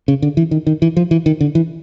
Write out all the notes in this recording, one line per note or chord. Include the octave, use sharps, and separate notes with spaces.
C#3
D3
E3
D#3
D#3
E3
F3
E3
D#3
D3
E3